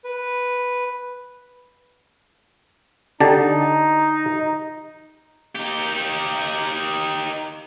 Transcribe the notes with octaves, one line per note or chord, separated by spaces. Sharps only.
B4
D3 D#4 G4 A5
D#4 G4